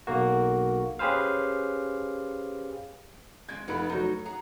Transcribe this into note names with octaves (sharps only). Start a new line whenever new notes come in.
B1 A#3 F#4
C#4 G4 G#4 B4 C5 F5
G#3 C4 G#6
F1 D#4 A#4 B4 F#5 B5
F#3 A3 D#4 F#4
G#4 F#5 A#5